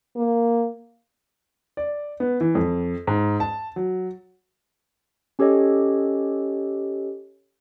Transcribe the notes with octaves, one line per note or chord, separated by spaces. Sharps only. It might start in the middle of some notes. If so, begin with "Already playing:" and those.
A#3
D5
B3
E3
F2
G#2
A5
F#3
C#4 G4 A4 C#5 D#5